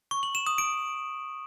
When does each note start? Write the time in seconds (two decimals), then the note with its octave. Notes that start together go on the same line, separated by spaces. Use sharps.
0.11 C#6
0.23 F#7
0.35 E7
0.47 D#6
0.58 D7